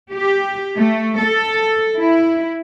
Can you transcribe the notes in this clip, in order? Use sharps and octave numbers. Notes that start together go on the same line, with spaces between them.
G4
A3
A4
E4